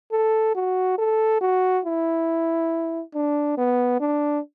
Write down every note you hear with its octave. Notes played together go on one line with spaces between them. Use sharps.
A4
F#4
A4
F#4
E4
D4
B3
D4